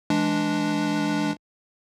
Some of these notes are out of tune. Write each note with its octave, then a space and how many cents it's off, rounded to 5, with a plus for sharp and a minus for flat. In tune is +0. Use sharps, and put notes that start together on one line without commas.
E3 +0 G#3 +10 D4 +0